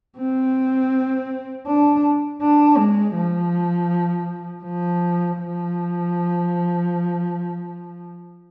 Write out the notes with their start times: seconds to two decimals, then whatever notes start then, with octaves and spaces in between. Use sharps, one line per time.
0.18 C4
1.67 D4
2.41 D4
2.78 G#3
3.15 F3
4.63 F3
5.38 F3